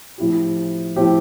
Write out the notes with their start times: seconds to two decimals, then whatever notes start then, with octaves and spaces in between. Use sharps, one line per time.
0.18 A2 F3 C4 E4 G4
0.96 A2 F3 C4 E4 G4